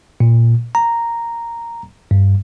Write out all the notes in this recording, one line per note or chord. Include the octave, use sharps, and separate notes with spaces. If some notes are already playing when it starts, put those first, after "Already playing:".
A#2
A#5
G2